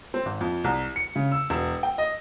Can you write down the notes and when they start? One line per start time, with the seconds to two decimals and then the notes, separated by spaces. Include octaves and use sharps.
0.14 C4
0.26 G#1
0.41 F2
0.64 C2
0.96 C#7
1.16 C#3
1.32 E6
1.50 E1
1.83 G5
1.98 D#5